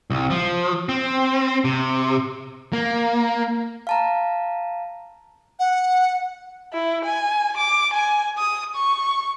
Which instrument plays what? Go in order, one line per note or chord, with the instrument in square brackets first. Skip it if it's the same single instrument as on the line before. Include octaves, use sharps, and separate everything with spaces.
[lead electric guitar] C2
F3
C4
C3
A#3
[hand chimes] F5 A5 A#5
[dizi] F#5
[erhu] E4
G#5
D6
G#5
D#6
C#6